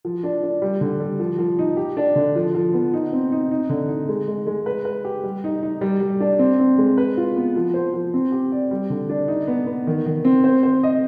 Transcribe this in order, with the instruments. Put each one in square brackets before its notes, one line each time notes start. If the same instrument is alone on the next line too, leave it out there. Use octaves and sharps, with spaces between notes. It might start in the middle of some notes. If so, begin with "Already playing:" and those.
[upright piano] F3
D4
D4
G3
D3
G3
F3
F3
D#4
G4
D4
D3
F3
F3
B3
D#4
C4
D#4
D#4
D3
D#4
G#3
G#3
G#3
B4
B4
G4
G3
D#4
D#4
G3
G3
D4
C4
C4
G#3
B4
F4
B3
F3
C5
F3
C4
G4
D5
G3
D3
D4
D#4
B3
B3
D#3
D#3
C4
C5
C5
D#5